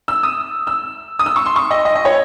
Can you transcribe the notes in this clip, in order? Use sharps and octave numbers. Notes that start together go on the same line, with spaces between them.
E6
D#6
E6
D#6
E6
C#6
C6
C#6
D#5
D#5
D#5
C#5